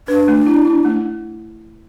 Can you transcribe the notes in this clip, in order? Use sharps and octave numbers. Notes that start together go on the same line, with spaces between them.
D4 B4
A3
E4
E4
A3